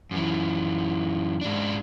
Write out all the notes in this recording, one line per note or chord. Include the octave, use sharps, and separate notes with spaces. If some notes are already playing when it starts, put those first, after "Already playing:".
F#2 E3
G#2 D4